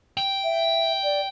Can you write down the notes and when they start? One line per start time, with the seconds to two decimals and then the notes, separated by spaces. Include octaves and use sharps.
0.17 G5
0.44 E5
1.03 D5